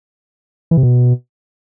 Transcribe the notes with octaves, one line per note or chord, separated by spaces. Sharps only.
E3
C3
B2